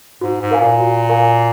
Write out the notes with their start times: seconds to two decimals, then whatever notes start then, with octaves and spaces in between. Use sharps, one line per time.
0.21 G#2 F#4
0.41 G#2
0.51 A#4 F5 G#5
0.60 A#2
0.80 F#4
1.09 A#4 F5 G#5